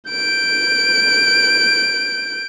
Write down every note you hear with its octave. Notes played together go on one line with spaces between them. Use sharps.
G6 D7